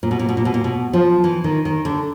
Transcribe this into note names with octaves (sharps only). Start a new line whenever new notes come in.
A#2
B2
A#2
B2
A#2
B2
A#2
B2
F3
E3
D#3
D#3
D3